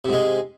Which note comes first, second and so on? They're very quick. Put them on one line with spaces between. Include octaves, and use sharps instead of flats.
C3 G#2 G#3